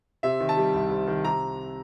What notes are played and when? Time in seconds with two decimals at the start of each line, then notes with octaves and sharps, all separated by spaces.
0.23 C3 E5
0.40 D#3
0.49 A5
0.57 G3
0.74 C2
0.90 C3
1.07 D#3
1.25 C3 A#5